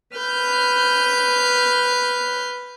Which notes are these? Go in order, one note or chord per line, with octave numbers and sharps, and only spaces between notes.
B4 F6 G6